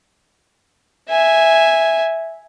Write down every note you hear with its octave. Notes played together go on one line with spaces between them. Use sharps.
E5 G#5